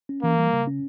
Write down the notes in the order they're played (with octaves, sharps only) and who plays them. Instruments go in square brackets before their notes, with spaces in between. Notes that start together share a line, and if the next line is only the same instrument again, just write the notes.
[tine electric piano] C#4
[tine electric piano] E3 [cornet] A#3
[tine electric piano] G3
C#3
C#4